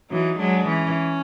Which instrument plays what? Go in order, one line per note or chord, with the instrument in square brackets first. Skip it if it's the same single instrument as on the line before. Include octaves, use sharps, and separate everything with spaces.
[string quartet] E3 F#3 [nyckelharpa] D#4
[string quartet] F#3 G#3 [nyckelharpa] D4
[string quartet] E3 [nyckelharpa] C#4